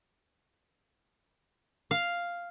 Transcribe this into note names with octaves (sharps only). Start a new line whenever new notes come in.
F5